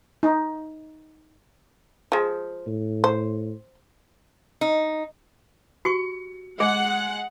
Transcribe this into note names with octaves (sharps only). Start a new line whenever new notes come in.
D#4
F3 G#3
A2
C5
D#4
F#4 G4 C#6 C#7
G#3 G#4 F#5